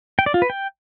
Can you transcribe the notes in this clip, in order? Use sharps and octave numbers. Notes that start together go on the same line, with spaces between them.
G5
D5
F4
B4
G5